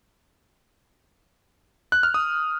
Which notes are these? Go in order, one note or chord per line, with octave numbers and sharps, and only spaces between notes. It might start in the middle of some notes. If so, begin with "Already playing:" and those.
F#6
F6
D#6